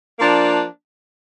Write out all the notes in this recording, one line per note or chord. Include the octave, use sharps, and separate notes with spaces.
F3 A#3 D4